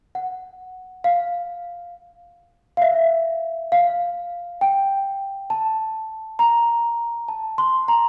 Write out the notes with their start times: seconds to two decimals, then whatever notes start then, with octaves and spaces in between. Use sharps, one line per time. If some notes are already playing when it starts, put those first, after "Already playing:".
0.15 F#5
1.04 F5
2.77 F5
2.82 E5
3.72 F5
4.61 G5
5.50 A5
6.39 A#5
7.28 A5
7.58 C6
7.88 A#5